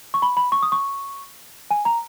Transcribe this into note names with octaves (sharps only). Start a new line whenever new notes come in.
C#6
B5
B5
C#6
D#6
C#6
G#5
A#5